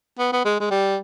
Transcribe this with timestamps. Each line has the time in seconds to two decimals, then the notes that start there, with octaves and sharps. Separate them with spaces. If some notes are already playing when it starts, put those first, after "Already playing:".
0.19 B3
0.32 B3
0.45 G#3
0.60 G#3
0.71 G3